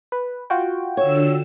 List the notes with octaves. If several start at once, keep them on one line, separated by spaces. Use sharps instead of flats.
B4
F4 F#4 G5
D3 C#5 E6